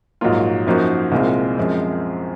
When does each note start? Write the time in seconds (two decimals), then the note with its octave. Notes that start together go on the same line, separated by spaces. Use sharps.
0.21 A#1 G#2 F#3 A#3 F4
0.67 F#2 F3 A#3 D#4 F#4
1.12 C2 A#2 G#3 C4 F4
1.58 F#2 F3 G#3 C4